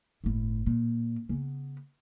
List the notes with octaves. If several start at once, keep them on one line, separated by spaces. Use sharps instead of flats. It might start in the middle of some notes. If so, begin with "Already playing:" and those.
G1 A2
A#2
C#3 B3